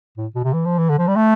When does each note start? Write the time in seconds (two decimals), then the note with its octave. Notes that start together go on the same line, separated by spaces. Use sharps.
0.17 A2
0.35 B2
0.44 C3
0.53 E3
0.66 F3
0.78 E3
0.90 D3
0.99 F3
1.08 G3
1.16 A3